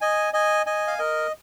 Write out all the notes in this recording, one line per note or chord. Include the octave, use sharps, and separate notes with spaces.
D#5 G#5
D#5 G#5
D#5 G#5
F5
A#4 D#5